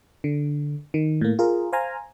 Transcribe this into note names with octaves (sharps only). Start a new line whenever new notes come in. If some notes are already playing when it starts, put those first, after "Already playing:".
D3
D#3
A2 A#3
F4 G#4 A#4
C5 F5 G#5 A#5